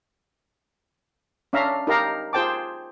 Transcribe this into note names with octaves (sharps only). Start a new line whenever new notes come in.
C#4 D4 E5 F5 A#5
D#4 G4 A#4 F5 A#5
F4 G#4 C5 G5 A5 D6